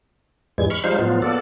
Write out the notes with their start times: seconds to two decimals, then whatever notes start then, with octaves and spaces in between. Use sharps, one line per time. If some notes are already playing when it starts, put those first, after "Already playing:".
0.58 F2 G#2 E3 G3 G#3 G#6
0.70 B5 C#6 F6
0.84 F3 G3 G#3 D#4 C5 F5
0.99 A2 F3 F#3 B3 F4
1.22 A#3 B3 A4 D5